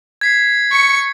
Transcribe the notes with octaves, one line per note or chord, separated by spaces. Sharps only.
G#6 B6 C7
C#6 C#7